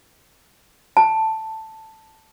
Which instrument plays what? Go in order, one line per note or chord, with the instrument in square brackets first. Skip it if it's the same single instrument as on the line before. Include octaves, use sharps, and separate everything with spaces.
[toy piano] A5